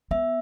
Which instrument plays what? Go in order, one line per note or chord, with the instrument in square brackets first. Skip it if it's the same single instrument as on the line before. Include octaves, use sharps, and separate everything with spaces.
[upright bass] B3 [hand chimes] E5